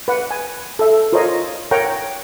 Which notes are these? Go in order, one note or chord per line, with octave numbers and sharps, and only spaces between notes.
B4 F#5
G#5
A4 E5
F4 A#4 C5 C#5 D#5
A#4 C#5 F#5 G5 A#5